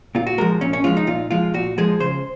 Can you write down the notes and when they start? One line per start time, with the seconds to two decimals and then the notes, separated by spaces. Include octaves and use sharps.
0.15 A#2 F4
0.27 F#4
0.38 F3 G#3 A#4
0.61 A#2 C#4
0.73 C#4
0.84 F3 G#3 F4
0.97 D#4
1.07 A#2 F4
1.31 F3 G#3 F4
1.54 A#2 F#4
1.78 F3 G#3 G#4
2.00 C#3 C5